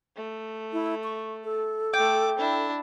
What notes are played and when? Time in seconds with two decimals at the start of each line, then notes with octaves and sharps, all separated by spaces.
0.16 A3
0.73 E4
1.04 C#6
1.44 A4
1.94 A3 G5 D6
2.38 D4 E4